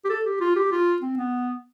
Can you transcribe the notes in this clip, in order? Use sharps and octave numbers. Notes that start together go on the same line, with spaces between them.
G4
A4
G4
F4
G4
F4
C4
B3